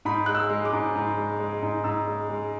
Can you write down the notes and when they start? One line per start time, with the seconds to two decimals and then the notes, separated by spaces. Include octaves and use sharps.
0.05 G#2 B5
0.26 G#3 F#6
0.35 E6
0.50 G#3
0.65 D6
0.73 G#2
0.95 G#2
1.17 G#3
1.40 G#3
1.63 G#2
1.84 G#2 E6
2.07 G#3
2.29 G#3